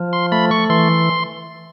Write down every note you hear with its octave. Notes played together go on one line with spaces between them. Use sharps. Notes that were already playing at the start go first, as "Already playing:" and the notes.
Already playing: F3
C6
A3 B5
C#6
E3 C6